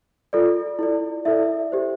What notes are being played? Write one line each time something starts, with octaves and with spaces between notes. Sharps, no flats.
F4 A4 D5
E4 A4 D5
E4 A4 D5 E5
G4 C5